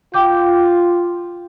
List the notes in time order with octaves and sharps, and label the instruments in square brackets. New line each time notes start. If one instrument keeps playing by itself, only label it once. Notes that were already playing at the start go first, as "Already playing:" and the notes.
[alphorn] F4 [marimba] G5 D6 G6